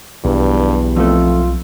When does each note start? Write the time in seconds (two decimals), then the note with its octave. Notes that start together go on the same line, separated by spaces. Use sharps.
0.24 B1 E2 G2 F#3
0.96 F2 A3 F4